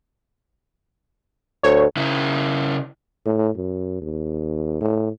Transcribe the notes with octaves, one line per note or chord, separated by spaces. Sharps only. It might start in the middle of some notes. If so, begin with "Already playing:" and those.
D2 C#5
C#3 E4
A2
F#2
D#2
A2